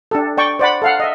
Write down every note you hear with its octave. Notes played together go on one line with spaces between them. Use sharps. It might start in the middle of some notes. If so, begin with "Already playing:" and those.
D4 G4 A4
D5 G5 C#6
C5 D5 F#5 B5
A4 F5 F#5
D#5 E5